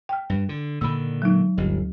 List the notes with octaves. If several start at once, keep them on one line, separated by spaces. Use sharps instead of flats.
G5 F6
G2
D3
A#2 D3 D#3 B5 E6
F#3 G#3 D#4
G1 D2 G4